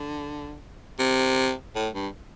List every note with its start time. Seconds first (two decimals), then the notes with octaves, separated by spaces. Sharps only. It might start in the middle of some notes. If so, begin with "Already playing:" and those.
Already playing: D3
0.99 C3
1.76 A2
1.94 G2